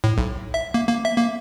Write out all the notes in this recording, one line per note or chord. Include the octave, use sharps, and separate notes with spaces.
A2
B1
E5
A#3
A#3
E5
A#3